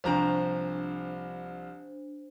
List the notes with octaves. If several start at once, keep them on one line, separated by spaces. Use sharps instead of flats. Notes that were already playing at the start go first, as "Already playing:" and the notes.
C2 F3 D4 C5 A#5